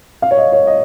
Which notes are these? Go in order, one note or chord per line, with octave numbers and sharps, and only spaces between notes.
F5
C#5
D#5
C#5
D#5